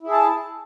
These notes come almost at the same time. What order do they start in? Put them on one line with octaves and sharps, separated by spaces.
E4 G#4 A5